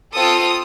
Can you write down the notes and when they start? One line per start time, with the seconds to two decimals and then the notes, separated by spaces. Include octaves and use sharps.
0.13 C4 F4 A4 D#6